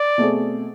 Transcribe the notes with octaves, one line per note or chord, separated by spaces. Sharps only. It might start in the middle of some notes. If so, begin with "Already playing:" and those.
Already playing: D5
B2 A3 C4 G#4